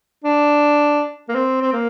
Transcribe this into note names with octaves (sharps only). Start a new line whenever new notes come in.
D4
A#3
C4
C4
A#3